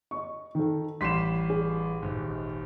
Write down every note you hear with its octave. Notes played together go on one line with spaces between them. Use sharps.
D#5 C#6
D#3 A4
A1 G3 C6 B6 C7 E7
G#4
D#1 G#1